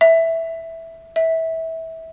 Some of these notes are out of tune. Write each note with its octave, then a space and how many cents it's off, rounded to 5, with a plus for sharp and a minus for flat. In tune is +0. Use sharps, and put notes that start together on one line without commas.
E5 -5
E5 -25